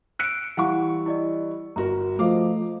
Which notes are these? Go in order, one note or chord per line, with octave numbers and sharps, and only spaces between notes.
E6 F#6 C#7 D7
E3 G3 E4 F5 F#5 C#6
E4 D5 D#5
G1 F#4 A#4 A#5
F3 A3 D#5 F5 D6